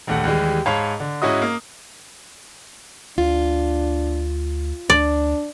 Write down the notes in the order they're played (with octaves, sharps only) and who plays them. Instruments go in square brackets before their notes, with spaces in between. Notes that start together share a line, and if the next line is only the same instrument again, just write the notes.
[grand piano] A#1 D#2 A3 F#5
D#2 E3 G3 G#3
G#2 C#5 F5 A5 B5 F7
D3
G#2 C#4 E4 F#4 D#5 D#6
A#3
[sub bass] D2 [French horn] D4 [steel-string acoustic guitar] F4
[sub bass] D2 [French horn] D4 [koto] D5